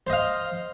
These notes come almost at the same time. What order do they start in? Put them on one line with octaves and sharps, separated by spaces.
C5 D#5 F5